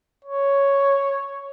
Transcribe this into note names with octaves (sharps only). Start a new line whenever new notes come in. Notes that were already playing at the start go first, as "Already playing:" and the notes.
C#5